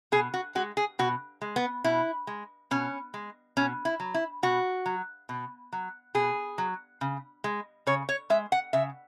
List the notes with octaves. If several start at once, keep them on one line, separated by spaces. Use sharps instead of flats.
B2 G#4
F#4
G#3 F#4
G#4
B2 F#4
G#3
B3
B2 E4
G#3
B2 C#4
G#3
B2 C#4
E4
F#3
E4
B2 F#4
F#3
B2
F#3
B2 G#4
F#3
C#3
G#3
C#3 C#5
C#5
G#3 E5
F#5
C#3 E5